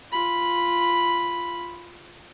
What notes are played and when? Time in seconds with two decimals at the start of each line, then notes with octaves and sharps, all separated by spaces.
0.12 F4 B5